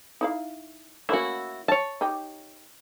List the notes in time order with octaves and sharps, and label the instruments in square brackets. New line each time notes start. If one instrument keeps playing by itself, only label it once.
[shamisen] D#4 E4 F5
[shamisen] A3 A#3 C#4 [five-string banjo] E4 F#4
[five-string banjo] C#5 A5
[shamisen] D#4 G4